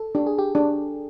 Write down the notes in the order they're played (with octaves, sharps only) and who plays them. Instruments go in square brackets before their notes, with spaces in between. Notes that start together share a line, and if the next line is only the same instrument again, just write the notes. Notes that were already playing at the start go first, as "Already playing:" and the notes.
Already playing: [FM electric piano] A4
[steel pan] D4 [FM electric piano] G4
[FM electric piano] G#4
G4
[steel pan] D4